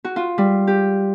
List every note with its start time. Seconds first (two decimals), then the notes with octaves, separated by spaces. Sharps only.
0.05 F#4
0.16 F4
0.38 G3
0.67 G4